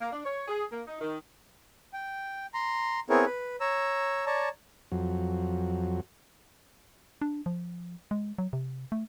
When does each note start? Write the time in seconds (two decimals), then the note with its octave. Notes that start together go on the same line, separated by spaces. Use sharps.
0.01 A#3
0.13 D4
0.25 C#5
0.48 G#4
0.72 A#3
0.87 D#4
1.00 D#3
1.93 G5
2.54 A#5 C6
3.10 B3 C4 E4 G#4 A#4 C#5
3.26 B4
3.60 C#5 A#5 E6
4.26 C#5 D5 A5 A#5
4.92 F2 F#3
7.22 D4
7.46 F3
8.11 G#3
8.38 F#3
8.53 C3
8.92 A3